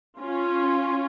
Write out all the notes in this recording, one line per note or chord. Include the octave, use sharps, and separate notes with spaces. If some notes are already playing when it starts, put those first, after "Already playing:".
C#4 F4